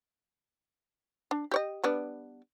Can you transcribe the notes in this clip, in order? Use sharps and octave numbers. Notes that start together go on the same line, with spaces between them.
D4
G4 C#5 D#5
G3 B3 D4